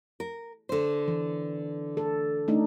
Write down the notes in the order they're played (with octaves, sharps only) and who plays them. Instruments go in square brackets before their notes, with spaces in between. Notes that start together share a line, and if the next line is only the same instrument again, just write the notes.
[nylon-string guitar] A#4
D3 C5
[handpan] E3
A4
A3 D4 D#4